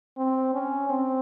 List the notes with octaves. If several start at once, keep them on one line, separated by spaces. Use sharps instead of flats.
C4
C#4
C4